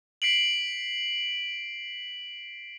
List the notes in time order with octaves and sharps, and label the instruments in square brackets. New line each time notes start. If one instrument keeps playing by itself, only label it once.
[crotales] B6 C7 D7 F#7